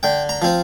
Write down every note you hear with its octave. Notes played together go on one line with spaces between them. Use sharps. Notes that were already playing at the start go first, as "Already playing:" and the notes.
D3 G5
A#5
F3 C4